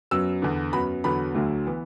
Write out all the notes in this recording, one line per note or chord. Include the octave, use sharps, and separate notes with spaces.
F#2 F#3 B3 E6
E2 D3 B3
F#2 F#3 B3 B5
E2 D3 F#3 B3 B5
D2 D3 F#3 A3
E3 B3